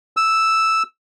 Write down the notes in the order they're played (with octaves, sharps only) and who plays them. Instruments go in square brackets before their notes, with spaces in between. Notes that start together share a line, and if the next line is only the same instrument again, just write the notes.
[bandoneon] E6